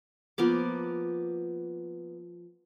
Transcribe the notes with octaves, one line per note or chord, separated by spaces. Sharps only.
F3 A#3 B3 D6